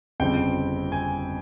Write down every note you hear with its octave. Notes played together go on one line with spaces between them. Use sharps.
G1 F2 C#3 G3 C4 G5
G#5